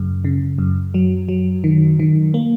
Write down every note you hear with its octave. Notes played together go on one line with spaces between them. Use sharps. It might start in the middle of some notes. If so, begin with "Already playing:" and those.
Already playing: F#2 C#3
C#3
F#2
F#3
F#3
D#3
D#3
A#3